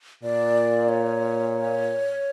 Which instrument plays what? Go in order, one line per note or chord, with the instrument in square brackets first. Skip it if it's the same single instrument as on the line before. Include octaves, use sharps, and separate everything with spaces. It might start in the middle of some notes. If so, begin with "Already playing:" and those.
[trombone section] A#2 [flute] D5
[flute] C#5